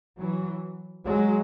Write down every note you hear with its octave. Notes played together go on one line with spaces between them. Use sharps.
E3 F#3
F#3 G#3